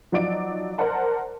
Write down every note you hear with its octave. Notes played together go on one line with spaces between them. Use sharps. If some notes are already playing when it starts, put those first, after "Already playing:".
F3 F#3 D#4 D5 D7
A#4 C5 D5 F#5 A5